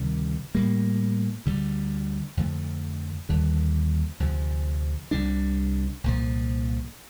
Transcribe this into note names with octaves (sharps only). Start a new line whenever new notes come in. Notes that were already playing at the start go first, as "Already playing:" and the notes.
Already playing: D2 C3 D#3 G3
A2 G3 A#3
D2 D3 G3
F2 D3 F3 A3
D#2 D3 G3
D2 C3 F3
C2 C3 G3 D4
C2 A#2 F3